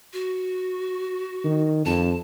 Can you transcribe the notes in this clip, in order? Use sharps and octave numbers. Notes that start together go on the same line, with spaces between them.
F#4
D#3
F2 A5